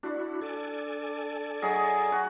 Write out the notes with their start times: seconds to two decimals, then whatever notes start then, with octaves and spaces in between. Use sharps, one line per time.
0.03 D4 E4 F#4
0.41 A4 D5 G#5
1.62 F#3 G#4 D#5
2.12 F#4